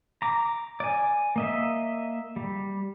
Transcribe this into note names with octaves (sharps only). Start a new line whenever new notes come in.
A#5 D6
D5 G#5
A#3 D#5 E5
G3